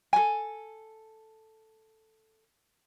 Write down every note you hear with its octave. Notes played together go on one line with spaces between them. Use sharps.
A4 G#5